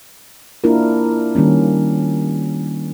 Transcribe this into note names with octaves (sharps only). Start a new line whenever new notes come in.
A#3 D4 E4 F4 A#4
D#3 G3 A#3 C#4